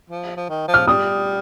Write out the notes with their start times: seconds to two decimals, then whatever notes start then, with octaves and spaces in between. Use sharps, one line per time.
0.10 F3
0.37 F3
0.49 D#3
0.68 F3
0.74 F6
0.87 G3 D#6